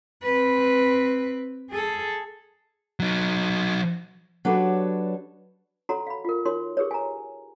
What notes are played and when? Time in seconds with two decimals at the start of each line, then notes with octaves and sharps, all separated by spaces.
0.23 C4 B4
1.70 G#4 A4
3.00 F#3 D#4
4.45 F#3 D4 G4 A4 B4 C#5
5.89 F#4 A4 C#5 F#5 A#5 C6
6.07 F5 B5
6.25 F4 A#4
6.45 D#4 F#4 A#4 C#5 C6
6.77 G4 G#4 A#4 B4 C#5
6.91 G#5 A#5